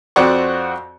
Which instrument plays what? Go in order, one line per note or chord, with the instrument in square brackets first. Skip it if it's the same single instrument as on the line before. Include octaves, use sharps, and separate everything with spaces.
[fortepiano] F2 C4 F#4 D5 F#5 C#6